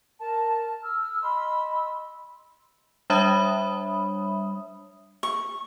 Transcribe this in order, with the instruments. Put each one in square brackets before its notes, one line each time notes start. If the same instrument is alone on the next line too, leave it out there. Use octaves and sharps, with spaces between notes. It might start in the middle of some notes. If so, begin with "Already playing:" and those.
[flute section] A#4 A5
E6 F6
D#5 B5 C6 E6
[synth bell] G3 D4 C#5 E5 B5 D#6
[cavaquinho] C#6